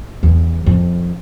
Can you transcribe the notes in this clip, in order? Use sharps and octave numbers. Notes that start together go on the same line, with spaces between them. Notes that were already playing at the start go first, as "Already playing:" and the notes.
E2
F2